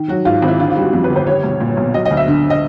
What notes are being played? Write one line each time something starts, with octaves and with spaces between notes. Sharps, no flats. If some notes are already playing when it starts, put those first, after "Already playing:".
Already playing: D#3
F#3 F#4
G#2 F4
G#1
E4
D3 F4
F4
G3
F#4
F2 F#4
B4
G1
C5
G3 C#5
B1
A#2
B1
F#3 D#5
D#5
D2
E5
D3
D#5